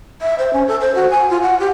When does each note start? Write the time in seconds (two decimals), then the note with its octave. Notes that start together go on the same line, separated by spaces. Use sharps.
0.22 E5
0.39 C5
0.53 C#4
0.68 A4
0.81 C5
0.95 F#4
1.11 G#5
1.30 F4
1.42 F#5
1.60 G4